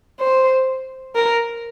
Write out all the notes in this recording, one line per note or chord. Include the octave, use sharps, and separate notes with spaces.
C5
A#4